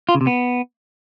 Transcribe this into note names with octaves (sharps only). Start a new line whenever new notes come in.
F4
C#3
C3
B3